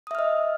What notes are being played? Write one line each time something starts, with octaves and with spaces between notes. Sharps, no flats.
D#5 E5 D#6 F6